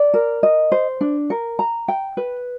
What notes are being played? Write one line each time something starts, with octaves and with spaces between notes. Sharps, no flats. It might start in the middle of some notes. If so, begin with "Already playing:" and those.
Already playing: D5
A#4
D#5
C5
D4
A#4
A#5
G5
B4